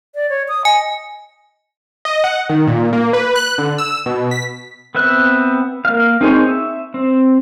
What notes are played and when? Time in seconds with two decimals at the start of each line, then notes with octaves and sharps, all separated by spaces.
0.15 D5
0.30 C#5
0.48 D#6
0.65 D#5 G#5
2.05 D#5
2.24 F#5
2.49 D#3
2.67 A#2
2.93 A#3
3.13 B4
3.35 F#6
3.58 D3
3.78 E6
4.06 B2
4.31 B6
4.95 B3 C4 E5 F#6
5.85 A#3 F5
6.21 C4 D#4 G#4 C5 C#5
6.47 E5
6.94 C4